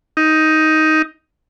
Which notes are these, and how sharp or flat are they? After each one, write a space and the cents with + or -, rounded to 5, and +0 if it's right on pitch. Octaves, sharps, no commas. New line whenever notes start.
D#4 +10